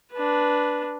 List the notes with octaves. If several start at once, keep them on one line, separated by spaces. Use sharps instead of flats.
D4 B4